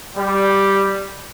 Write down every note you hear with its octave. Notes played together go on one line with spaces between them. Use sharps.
G3